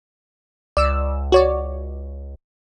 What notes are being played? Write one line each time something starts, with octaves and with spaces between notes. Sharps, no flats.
C#2 D5 E6
F#4 C#5 D5